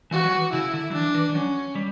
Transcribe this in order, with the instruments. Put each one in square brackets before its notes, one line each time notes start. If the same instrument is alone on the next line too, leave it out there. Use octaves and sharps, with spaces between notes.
[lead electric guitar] E3 [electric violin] F#4
[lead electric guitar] F#3
E3
[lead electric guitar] C#3 [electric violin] E4
[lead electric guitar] D3
F#3
[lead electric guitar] E3 [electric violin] D4
[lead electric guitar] E3
E3
[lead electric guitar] F#3 [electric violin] C#4
[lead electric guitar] G3